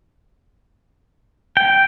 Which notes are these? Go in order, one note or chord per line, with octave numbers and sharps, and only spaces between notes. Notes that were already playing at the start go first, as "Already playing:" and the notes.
G5